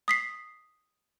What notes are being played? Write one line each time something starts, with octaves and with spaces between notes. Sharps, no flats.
D#6 B6 C7